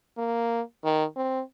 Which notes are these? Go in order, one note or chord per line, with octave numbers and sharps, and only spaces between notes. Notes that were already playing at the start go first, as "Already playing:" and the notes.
A#3
D#3
C4